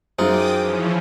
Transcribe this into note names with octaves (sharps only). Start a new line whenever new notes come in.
F#2 G#3 D#4 F4 C5 G5 D6 D#6
E3 F3 C#4